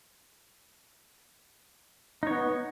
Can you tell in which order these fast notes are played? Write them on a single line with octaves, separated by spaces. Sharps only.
D#4 C#5 B3